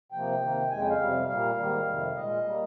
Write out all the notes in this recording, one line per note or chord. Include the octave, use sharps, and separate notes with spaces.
C3 F3 A#3 G5
C3 D#3 A#3
F2 C#3 G#3 G#5
G5
F5
F2 C3 G3
A#2 G3 A#3 F5
G#2 D#3 G3 A#3
F2 C3 D#3 G3
A#2 G#3 D#5
G3 A#3